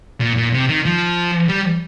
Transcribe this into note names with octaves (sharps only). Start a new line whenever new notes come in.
A#2
A#2
C3
D#3
F3
G3